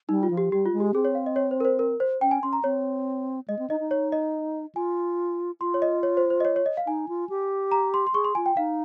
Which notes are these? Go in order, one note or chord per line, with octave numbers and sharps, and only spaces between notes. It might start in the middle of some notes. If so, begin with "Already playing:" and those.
G3 D#4
F4
F3
G4
G3 G4
F4
G#3
G4
C4 G#4
C#5
F5
D#5
C#5
C5
A#4
C5
A#4
C5
C#4 G5
G#5
C#4 C6
A#5
C4 C#5
G#3 D#5
C4
D#4 D#5
D#4
C#5
D#5
F4 G#5
F4 C6
C#5
D#5
C#5
C5
C5
D#5
C#5
C#5
D#5
F5
D#4 G#5
F4
G4
A#5
C6
C6
G#4 C#6
C6
F4 G#5
G5
D#4 F5